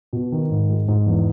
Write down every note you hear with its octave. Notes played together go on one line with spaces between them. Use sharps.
B2
D#3
G#2
G#3
G#2
E2